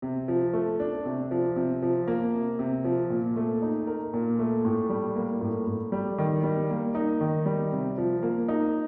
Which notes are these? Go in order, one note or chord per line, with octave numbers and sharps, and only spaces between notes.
C3
F3
A3
D4
C3
F3
C3
F3
A#3
C3
C3
F3
A#2
A3
D#4
A#4
A#2
A3
A2
G3
A#3
A2
A2
G3
D#3
G3
A#3
D#4
D#3
G3
C3
F3
A#3
D#4